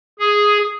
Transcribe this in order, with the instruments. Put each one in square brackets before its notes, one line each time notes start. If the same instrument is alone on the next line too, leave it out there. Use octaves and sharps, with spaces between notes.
[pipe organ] G#4